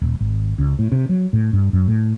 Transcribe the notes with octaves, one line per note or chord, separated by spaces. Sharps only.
D#1
G#1
C#2
A2
C3
F#3
A2
G2
F#2
A2